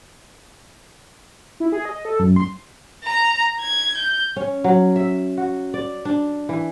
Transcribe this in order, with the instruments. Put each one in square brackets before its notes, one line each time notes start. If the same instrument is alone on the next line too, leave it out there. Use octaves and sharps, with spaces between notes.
[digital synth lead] E4
G#4
D#5
A4
F#2
C6
[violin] A#5
G#6
G6
[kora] C#4
F#3
E5
F#4
D5
D4
E3